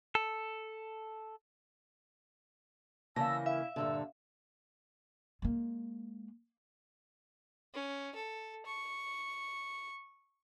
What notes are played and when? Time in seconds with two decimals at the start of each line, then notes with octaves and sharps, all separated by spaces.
0.15 A4
3.16 C#3 E3 A#3 D5 F5 A5 E6 A#6
3.46 E4 E5 F5
3.76 G2 A#2 D3 E6
5.42 G#3 A#3
7.74 C#4
8.15 A4
8.66 C#6